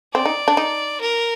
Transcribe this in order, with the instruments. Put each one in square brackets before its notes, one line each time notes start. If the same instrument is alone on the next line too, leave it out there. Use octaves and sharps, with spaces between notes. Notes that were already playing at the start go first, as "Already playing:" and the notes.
[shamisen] C4 [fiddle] D5
[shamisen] D#4
D4
D#4
[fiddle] A#4